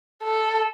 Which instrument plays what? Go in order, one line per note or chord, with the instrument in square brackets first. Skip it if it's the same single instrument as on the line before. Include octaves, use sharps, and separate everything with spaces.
[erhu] A4